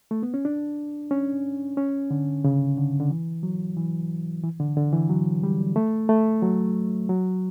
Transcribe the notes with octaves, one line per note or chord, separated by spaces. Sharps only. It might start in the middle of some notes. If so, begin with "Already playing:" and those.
A3
B3
C#4
D4
C#4
C#4
D3
C#3
D3
D3
E3
F#3
E3
E3
D3
D3
E3
F#3
G3
A3
A3
F#3
F#3